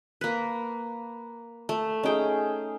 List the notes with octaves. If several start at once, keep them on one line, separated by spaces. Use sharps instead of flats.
A#3 B4
A3
C#4 D#4 G#4 G5